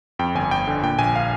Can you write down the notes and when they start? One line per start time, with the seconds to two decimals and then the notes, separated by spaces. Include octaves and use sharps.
0.19 F2 G5
0.35 G1 G#5
0.51 G1 G5
0.67 D3
0.83 A#2 G5
0.99 A#1 G#5
1.16 F5